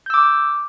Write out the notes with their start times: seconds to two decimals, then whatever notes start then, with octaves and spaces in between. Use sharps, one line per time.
0.06 G6
0.10 E6
0.14 D6